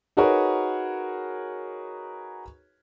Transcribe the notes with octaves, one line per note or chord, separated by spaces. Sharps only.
D#4 F#4 G#4 A#4 B4 C#5